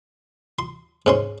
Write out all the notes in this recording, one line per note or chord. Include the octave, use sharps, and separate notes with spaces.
C6
G#2 C#4 C6